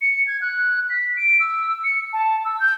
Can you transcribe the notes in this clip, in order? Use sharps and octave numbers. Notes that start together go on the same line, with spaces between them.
C#7
G#6
F#6
B6
D7
E6
C#7
A5
E6
G6